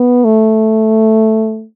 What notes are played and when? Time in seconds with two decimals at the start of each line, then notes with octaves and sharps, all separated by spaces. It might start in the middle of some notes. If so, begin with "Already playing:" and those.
Already playing: B3
0.25 A3